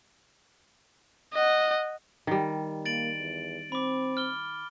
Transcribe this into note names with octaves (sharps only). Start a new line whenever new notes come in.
D#5 F#5
D#3 G3
A#3 A6 D7 F#7
E2
C4 B5 D6
F6 G7